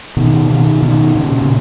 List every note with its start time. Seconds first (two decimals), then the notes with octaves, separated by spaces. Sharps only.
0.17 B2 D#3
0.49 B2 D#3
0.82 B2 D#3
1.15 A#2 C#3
1.42 A#2